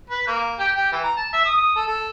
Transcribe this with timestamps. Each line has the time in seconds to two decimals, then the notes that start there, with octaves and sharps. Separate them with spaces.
0.10 B4
0.27 A#3
0.59 G4
0.76 G4
0.92 E3
1.04 A#5
1.17 A5
1.33 E5
1.45 D#6
1.76 A4
1.88 A4